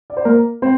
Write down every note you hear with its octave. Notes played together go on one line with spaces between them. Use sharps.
D5
C5
A#3 A#4
C4 C5